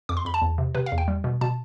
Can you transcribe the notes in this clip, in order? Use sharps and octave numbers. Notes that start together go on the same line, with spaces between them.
F2 D6
C6
F2 B5
A5
E2
C3
C3 B4
F5
E2
G5
G3
B2
B2 A5